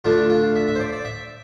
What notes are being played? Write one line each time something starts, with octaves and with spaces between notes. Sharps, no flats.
D3 A3 D4 F4
F4
E5
E5
C5
D5
D5
E5